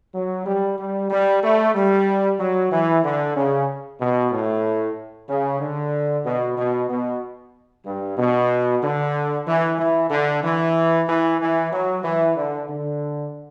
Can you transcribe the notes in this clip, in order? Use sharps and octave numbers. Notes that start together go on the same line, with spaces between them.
F#3
G3
G3
G3
A3
G3
F#3
E3
D3
C#3
B2
A2
C#3
D3
B2
B2
B2
G2
B2
D3
E3
E3
D3
E3
E3
E3
F#3
E3
D3
D3